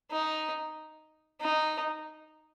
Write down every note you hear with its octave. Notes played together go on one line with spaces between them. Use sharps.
D#4
D#4